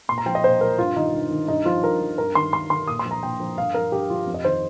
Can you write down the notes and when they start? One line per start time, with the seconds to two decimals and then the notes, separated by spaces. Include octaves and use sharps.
0.09 A#2 C6
0.18 A#5
0.26 F3 G5
0.35 D#5
0.44 A#2 C5
0.61 F3 A#4
0.78 G2 F4
0.96 D#3 D#4
1.14 G2
1.31 D#3
1.48 G2 D#4
1.66 F3 F4
1.84 G2 A#4
2.01 F3
2.18 G2 A#4
2.35 D#3 C6
2.53 G2 C6
2.70 D#3 C6
2.88 A#2 D#6
2.99 C6
3.05 F3
3.11 A#5
3.23 A#2 G5
3.40 F3
3.57 G2 F5
3.74 F3 A#4
3.92 G2 G4
4.10 F3 F4
4.27 F2
4.34 D#5
4.45 D#3 C5